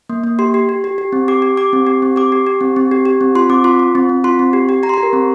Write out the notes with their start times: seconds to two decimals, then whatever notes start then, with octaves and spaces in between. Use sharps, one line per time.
0.10 A#3
0.24 A#3
0.39 G4 C6
0.54 G4
0.69 G4
0.84 G4
0.98 G4
1.12 C4
1.28 G4 D6
1.42 G4
1.57 G4 D6
1.73 C4
1.87 G4
2.02 C4
2.16 G4 D6
2.32 G4
2.47 G4
2.61 C4
2.76 C4
2.91 G4
3.05 G4
3.21 C4
3.35 F4 C6
3.49 C4 D6
3.64 F4 C6
3.79 F4
3.95 C4
4.09 C4
4.24 F4 C6
4.39 C4
4.53 G4
4.69 G4
4.83 G4 A#5
4.89 C6
4.94 A#5
4.98 G4
5.03 A#4
5.13 C4